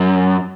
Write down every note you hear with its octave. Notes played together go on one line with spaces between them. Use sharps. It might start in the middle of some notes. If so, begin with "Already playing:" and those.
Already playing: F#2